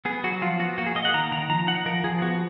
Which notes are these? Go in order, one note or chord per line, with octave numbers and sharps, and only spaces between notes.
B3 G#4
F#3 F#4
F3 F4
B3 F#4
A#3 F#4
G#4
A#3 D#5
F#5
D#3 A#5
D#3 A#5
F3 A#5
D#4 F#5
F3 A#4
F3 G#4
B3 F#4